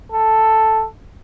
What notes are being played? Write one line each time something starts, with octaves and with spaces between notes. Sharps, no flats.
A4